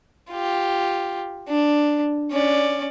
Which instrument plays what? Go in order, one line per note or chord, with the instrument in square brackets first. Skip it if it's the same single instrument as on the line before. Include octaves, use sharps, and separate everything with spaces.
[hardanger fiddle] F4 G4
D4
C#4 D5